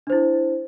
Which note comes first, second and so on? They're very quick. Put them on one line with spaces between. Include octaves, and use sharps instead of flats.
D4 C5 E4